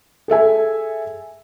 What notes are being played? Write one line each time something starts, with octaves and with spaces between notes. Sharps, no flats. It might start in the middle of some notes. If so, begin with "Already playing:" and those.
G#4 A4 E5 G#5